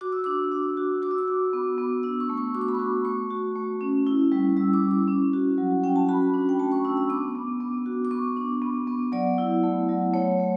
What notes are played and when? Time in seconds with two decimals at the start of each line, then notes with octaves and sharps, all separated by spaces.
0.01 F#4 D6
0.12 E6
0.24 D4 D6
0.52 D4
0.77 F#4
1.02 F#4 D6
1.11 E6
1.18 D6
1.28 F#4
1.53 B3
1.78 B3
2.03 D4 E6
2.20 C#6
2.29 A3
2.38 C#6
2.55 F#4 D6
2.61 C#6
2.68 B5
2.75 C#6
2.79 F#4
3.05 A3 C#6
3.31 F#4
3.56 A3
3.81 C#4
4.07 E4
4.32 G3
4.57 G3 E6
4.73 D6
4.82 E4
4.91 D6
5.08 C#4
5.33 F#4
5.58 F#3
5.84 C#4 G5
5.96 A5
6.09 F#4 B5
6.34 D4
6.49 G5
6.59 A3 A5
6.72 C#6
6.85 D4 E6
6.97 E6
7.10 B3 D6
7.35 B3
7.61 B3
7.86 F#4
8.05 D6
8.11 B3 C#6
8.37 D4
8.62 B3
8.87 B3
9.12 F#3 D5
9.38 E4
9.63 A3
9.89 F#3
10.14 A3 C#5
10.39 A3